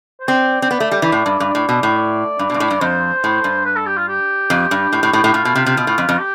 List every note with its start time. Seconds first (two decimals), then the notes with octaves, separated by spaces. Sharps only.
0.20 C5
0.28 C4 D5
0.62 C4
0.71 B3
0.80 A3
0.92 G3
1.02 E3
1.12 A2
1.26 G2
1.40 G2
1.55 A2
1.69 B2
1.83 A2
1.97 D5
2.39 G2
2.50 B2
2.54 G2
2.60 A2
2.70 G2
2.81 F2 C5
3.24 A2
3.44 G2
3.66 B4
3.76 A4
3.86 G4
3.97 F4
4.08 G4
4.50 F2
4.71 G2
4.93 A2
5.03 A2
5.13 A2
5.24 A2
5.27 G4
5.34 A2 F4
5.45 B2
5.55 C3
5.66 C3
5.77 B2
5.87 A2
5.98 F2
6.09 F2
6.19 G4